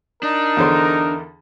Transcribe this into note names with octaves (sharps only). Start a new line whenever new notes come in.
D4 D#4 A#4
E2 D3 C5